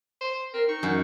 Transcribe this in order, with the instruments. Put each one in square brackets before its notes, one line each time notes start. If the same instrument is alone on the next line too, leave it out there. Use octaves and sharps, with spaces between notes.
[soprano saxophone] C5
[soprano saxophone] C4 [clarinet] A#4
[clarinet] D#4 [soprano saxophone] C#6
[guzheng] F#2